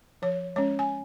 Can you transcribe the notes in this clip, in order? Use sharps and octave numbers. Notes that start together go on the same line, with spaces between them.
F3 C#5
G#3 C#4 C#5
G#5